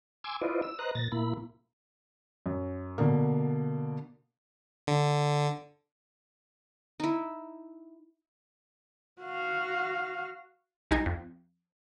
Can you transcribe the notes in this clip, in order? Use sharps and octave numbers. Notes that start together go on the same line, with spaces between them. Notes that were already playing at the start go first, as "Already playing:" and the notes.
G#5 C6 D6 E6
E4 F4 B4 C5 D5 D#5
E6
B4 C5 D#5 A#5 F#6
A#2 A6 A#6
A#2 A#3 E4 B5
F#2
B2 D3 A#3
D3
D#4 E4
F#4 F5
C2 G#3 D#4 G#6
F2